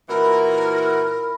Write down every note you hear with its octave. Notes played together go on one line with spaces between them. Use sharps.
A#2 E3 E4 F#4 A#4